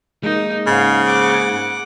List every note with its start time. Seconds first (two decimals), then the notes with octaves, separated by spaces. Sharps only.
0.23 G#3 A#3 D#4
0.67 G#2 C#3 F5
1.05 F#5 D6